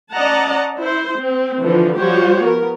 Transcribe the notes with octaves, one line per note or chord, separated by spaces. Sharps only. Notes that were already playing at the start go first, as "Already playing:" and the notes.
C#4 D5 D#5 F#5 A5 A#5
E4 C5
C4
D3 E3 F3
F3 G3 F#4 G4 C5 C#5
B3 A#4